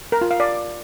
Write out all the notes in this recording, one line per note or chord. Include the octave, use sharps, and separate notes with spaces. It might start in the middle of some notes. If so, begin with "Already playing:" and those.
A#4
F4
F5
D5